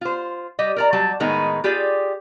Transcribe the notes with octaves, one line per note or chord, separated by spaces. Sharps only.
F4 C5
G3 G4 D#5
A#4 D5 A#5
F#3 G3 A5
A2 D#3 G#3 B3 D#4
F4 G4 G#4 D5